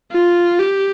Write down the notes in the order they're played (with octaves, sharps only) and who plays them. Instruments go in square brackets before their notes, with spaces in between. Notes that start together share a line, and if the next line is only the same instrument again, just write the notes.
[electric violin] F4
G4